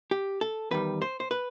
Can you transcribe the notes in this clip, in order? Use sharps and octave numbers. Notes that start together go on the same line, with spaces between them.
G4
A4
E2 D#3 G3 B4
C5
C5
B4